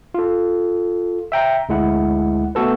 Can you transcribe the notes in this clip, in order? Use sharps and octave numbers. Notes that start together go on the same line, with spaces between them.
F4 A4
E5 G5 A#5
D2 G#3 E4 F#5
A3 B3 F#4 A4 B4